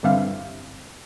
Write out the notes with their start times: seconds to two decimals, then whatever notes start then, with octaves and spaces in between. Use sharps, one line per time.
0.03 G2 D3 G3 C4 E4 F5